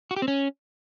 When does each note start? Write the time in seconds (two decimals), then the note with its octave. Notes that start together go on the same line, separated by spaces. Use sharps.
0.11 F#4
0.16 G4
0.22 C4
0.28 C#4